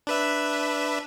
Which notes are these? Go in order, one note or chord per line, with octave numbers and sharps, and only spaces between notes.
D4 B4 E5